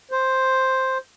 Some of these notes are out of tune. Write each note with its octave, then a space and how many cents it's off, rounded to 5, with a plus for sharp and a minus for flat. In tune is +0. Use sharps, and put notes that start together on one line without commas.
C5 +5